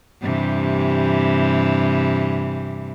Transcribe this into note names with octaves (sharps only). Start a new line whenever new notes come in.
G2 C3 E3